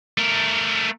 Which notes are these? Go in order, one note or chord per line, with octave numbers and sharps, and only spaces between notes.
A3 A#4